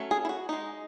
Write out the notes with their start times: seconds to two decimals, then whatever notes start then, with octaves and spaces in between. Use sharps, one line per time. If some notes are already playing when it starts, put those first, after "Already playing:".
Already playing: F#3 A3 C#4
0.11 G#4
0.25 E4
0.29 F#4
0.49 G#3 D#4